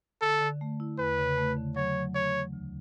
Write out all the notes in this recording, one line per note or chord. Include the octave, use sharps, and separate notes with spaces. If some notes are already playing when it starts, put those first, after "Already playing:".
D3 A4
D3
A3
E4
E2 B4
C#3
A3
D3
F#3 C#5
F#3
A3 C#5
E3
D2